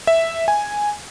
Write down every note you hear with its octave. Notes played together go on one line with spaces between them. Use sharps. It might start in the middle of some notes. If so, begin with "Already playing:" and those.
E5
G#5